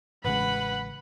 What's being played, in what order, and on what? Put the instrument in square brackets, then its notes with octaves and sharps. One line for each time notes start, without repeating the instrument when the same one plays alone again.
[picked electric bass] A1 C#3 G#3 [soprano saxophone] B4 [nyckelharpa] F#5 [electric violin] B5